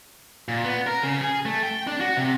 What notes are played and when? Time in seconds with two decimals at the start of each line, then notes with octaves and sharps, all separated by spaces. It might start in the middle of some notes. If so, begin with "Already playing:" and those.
0.48 A#2
0.64 B3
0.87 A#4
1.03 C#3
1.21 G#4
1.46 A3
1.63 G5
1.87 D4
2.00 F#4
2.17 C3